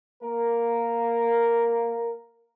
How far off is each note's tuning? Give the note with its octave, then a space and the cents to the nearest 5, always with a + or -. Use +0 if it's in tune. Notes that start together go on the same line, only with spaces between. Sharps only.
A#3 +0 A#4 +0